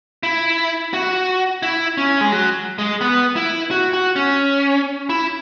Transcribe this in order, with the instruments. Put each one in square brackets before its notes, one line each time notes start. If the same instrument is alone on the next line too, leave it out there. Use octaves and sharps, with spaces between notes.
[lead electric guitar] E4
F#4
E4
C#4
G#3
F#3
G#3
B3
E4
F#4
F#4
C#4
E4